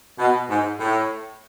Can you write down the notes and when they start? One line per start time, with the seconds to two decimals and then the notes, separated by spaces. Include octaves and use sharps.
0.19 B2
0.50 G#2
0.80 A2